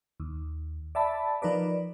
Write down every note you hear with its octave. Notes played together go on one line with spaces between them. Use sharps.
D#2
D5 E5 A5 B5
F3 D#4 A#4 B4 D5